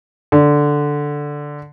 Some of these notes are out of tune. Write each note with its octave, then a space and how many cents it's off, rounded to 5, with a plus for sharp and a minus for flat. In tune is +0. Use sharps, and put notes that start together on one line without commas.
D3 +0